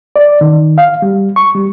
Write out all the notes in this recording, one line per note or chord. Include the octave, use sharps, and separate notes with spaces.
D5
D#3
F5
G3
C#6
G3